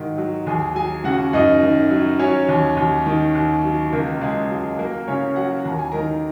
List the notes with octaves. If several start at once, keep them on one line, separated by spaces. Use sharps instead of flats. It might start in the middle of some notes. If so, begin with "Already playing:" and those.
Already playing: G#2 D#3 F#3
F#3
D#2 G#4 G#5
F#3 G#4 G#5
C#3 F#4 F#5
F#2 D#4 D#5
D#3
F#3
F#3 C#4 C#5
D#2
D#2
D#3
D#2
F#3
C#2 A#3 A#4
C#2 G#3 G#4
F#3
F#3 A#3 A#4
C#3 C#4 C#5
F#3 F#4 F#5
D#2 A#5
G#5
D#3 A#4 A#5